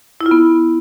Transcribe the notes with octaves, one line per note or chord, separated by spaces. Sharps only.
E4
F4
B3